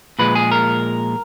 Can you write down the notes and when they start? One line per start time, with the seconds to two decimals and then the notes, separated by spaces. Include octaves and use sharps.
0.19 A#2 F3 G#3 B4
0.35 G#4
0.52 A#4